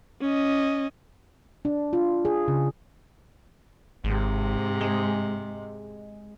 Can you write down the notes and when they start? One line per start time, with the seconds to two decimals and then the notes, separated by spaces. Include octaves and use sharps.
0.21 C#4 D#5
1.65 D4
1.93 F4
2.25 G#4
2.48 C#3
4.04 G#1 G#2 C3
4.81 G#3